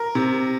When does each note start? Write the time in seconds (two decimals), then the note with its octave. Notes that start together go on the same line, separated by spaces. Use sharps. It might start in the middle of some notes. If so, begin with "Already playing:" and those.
Already playing: A#4
0.15 C3